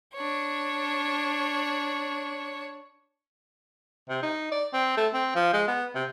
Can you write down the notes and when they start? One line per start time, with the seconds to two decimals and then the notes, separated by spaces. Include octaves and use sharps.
0.15 D4 C#5
4.09 C3
4.23 D#4
4.51 D5
4.73 C4
4.97 A3
5.14 C4
5.35 F3
5.53 G#3
5.68 B3
5.95 C3